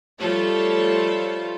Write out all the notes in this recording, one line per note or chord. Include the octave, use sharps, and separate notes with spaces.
F3 G3 A3 F4 A4 C#5